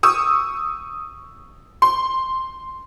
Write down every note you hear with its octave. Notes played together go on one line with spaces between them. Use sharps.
C#6 D#6 E6
C6